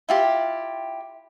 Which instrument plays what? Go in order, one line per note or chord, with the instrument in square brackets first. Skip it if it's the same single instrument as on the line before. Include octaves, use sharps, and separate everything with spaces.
[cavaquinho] E4 F4 G4